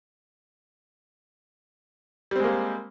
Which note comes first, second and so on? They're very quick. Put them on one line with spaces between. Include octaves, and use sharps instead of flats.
G3 C4 G#3 A#3